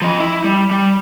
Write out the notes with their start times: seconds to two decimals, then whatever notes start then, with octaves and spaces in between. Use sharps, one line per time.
0.02 F3 D#5
0.20 E4
0.44 G3
0.71 G3